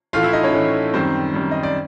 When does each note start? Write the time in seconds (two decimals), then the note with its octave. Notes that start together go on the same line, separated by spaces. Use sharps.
0.13 A2 E3 A3 F4 F5
0.23 E4 E5
0.33 D#4 D#5
0.43 C#4 C#5
0.53 A2 E3 A3
0.94 F#2 D#3 G3 C4 C5
1.34 F#2 D#3 G3
1.51 D#5
1.63 D5